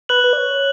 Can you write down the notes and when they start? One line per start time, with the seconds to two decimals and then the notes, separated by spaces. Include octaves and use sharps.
0.09 B4 F#6 F#7
0.24 B4
0.33 D5
0.38 C#5